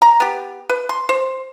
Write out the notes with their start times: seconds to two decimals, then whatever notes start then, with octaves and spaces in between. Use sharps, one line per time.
0.02 A#5
0.20 B3 G4
0.69 B4
0.89 C6
1.09 C5